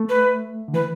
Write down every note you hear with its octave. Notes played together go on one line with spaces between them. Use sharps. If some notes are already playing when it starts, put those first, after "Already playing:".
Already playing: A3
B4
D3
E3 B4